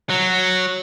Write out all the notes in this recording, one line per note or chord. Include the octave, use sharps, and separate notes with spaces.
F#3